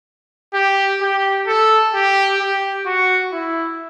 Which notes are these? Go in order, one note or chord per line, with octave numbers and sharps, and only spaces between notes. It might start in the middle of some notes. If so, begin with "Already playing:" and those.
G4
G4
A4
G4
G4
F#4
E4